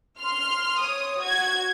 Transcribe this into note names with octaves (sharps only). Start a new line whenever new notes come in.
C6 F6
C#5 D#6
F#4 G#6